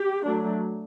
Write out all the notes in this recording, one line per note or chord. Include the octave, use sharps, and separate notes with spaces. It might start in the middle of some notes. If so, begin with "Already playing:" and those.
Already playing: G4
F#3 A3 D4